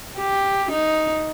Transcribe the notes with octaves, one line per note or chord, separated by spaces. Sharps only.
G4
D#4